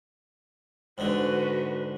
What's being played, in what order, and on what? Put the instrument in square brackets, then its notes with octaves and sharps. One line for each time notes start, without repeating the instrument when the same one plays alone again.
[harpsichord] G#2 D3 [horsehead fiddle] F#4 B4